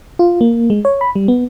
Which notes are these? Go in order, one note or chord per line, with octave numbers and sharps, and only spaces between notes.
F4
A#3
G#3
C#5
B5
G3
B3